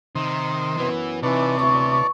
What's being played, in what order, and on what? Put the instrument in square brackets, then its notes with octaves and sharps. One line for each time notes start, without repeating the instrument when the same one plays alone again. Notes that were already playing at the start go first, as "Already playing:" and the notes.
[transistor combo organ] C3 C5 D#5 [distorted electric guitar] D#3
[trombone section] F#2 B3 [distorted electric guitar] E3
[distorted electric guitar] C3 [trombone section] E3 D#4 B4 [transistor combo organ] C#5 D5 A5
[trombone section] D2 B2 E3 [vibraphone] C#6